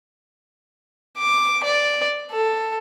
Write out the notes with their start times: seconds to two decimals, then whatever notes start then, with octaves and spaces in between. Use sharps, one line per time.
1.18 D6
1.64 D5
2.31 A4